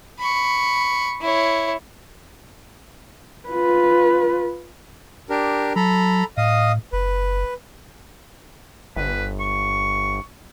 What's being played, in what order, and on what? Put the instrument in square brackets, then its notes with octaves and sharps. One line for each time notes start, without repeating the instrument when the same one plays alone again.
[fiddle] B5 C#6
E4 C#5
[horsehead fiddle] F4 B4
[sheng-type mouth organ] D4 G4 A#4
[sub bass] F#3 [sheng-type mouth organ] A4 A#5 B5
[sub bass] A2 [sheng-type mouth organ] D#5 F5 D#6
[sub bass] F#1 [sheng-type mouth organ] B4
[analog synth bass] G1 [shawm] B4
[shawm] C#6